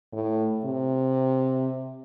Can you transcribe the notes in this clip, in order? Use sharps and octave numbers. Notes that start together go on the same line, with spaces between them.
A2
C3